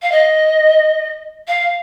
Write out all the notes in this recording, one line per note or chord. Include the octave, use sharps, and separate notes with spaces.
F5
D#5
F5